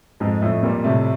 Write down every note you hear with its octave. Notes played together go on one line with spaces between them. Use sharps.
F2 G#2 G#3
F2 A2 A3
A#2 G3 A#3
A2 C3 A3